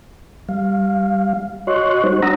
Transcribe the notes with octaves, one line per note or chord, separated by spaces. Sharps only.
G3 F5
F#4 C#5 D#5 C6 C#6 F#6
G3 D#4 F#4 C5 C#5
D4 F#5 A#5 D#6 E6 A#6